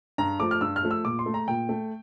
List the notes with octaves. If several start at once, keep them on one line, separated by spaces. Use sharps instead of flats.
G2 A#5
F3 A3 D6
F6
G2 E6
F6
F3 A3
E6
A#2 D6
C6
A3
A#5
A#2 G5
A3